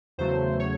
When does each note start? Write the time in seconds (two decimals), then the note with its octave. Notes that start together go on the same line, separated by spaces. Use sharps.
0.18 E2 C#3 F#3 A3 C5
0.60 C#5